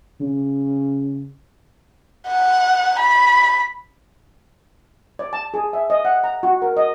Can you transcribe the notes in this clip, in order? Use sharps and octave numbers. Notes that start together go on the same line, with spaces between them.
C#3
F#5
B5
D5
A5
G#4
E5
D#5
F#5
A#5
F#4
A#4
D#5